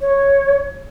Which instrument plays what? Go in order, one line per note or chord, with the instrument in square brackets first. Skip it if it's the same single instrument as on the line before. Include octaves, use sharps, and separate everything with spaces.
[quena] C#5